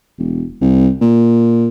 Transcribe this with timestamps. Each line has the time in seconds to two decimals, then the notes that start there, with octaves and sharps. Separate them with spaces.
0.18 E1
0.61 C2
1.01 A#2